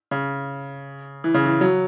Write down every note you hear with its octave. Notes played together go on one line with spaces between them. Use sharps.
C#3
E3
C#3
E3
F#3